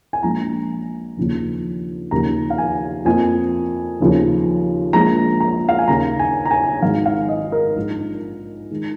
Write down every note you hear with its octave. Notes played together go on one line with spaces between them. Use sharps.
G#5
A#1 A#2 G#3 A#5
F1 D#2 C#3 F3 A#3
D#2 C#3 F3 A#5
F5
G#5
F2 F3 A#3 G#5
F1 D#2 C#3 F3
A#1 A#2 F3 G#3 A#5
A#5
F5
G#5
D#2 C#3 A#3 A#5
G#5
A#5
G#5
G#1 G#2 G#3 F5
F5
D#5
A#4
A#1 G#2 F3 G#3
D#3 G#3